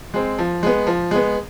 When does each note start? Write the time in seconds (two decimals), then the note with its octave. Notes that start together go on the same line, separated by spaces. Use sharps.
0.14 G#3 C4
0.38 F3
0.63 G#3 B3
0.87 F3
1.11 G#3 B3